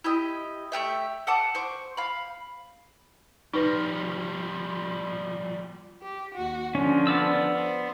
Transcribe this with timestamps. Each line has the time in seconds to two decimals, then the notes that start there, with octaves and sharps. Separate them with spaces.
0.04 E4 G4 D#5
0.72 A3 C#4 G4 E5
1.27 A4 F#5 A5 D6
1.55 C5 C#6 D6
1.97 F5 B5
3.54 F3 G3 D#4 B4 A#6
6.02 G4
6.34 D#2 F#4
6.75 D3 F3 C#4
7.07 B3 D5 E6
7.54 C5